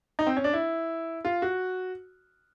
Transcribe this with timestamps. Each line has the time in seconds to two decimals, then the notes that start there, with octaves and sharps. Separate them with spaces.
0.19 D#4
0.27 C4
0.37 C#4
0.44 D4
0.53 E4
1.25 F4
1.42 F#4